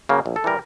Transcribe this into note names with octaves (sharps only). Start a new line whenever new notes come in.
C#3 F#3 A#3
A#1
A4
E3 G3 A#4